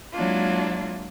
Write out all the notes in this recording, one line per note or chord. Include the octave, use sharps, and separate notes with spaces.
F#3 G#3 A#3 D4 E4 F4